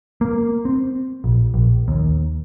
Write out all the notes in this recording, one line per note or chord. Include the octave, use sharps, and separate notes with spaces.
A#3
C4
A#1
A#1
D#2